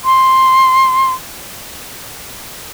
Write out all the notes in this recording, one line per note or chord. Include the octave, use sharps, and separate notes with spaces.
C6